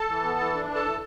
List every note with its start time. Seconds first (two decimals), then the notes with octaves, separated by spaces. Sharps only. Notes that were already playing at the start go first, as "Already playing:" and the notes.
Already playing: A4 A5
0.09 E3
0.24 B3
0.39 E3
0.54 D4
0.70 E3
0.75 A4 A5
0.85 E3